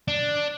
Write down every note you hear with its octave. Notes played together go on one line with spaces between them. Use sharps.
D4